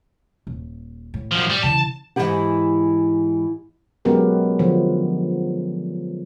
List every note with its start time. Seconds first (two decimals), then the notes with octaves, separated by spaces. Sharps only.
0.47 D#1
1.14 A2
1.32 F#2 F3
1.50 G3
1.63 C#3 E3 A5
2.16 G#2 E3 C#4 E4 G4 F#5
4.05 F#3 G#3 B3 C#4 G4 A#4
4.59 D3 F3